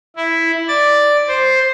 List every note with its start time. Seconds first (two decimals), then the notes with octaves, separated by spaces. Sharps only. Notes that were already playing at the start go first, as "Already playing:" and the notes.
0.16 E4
0.68 D5 A6
1.28 C5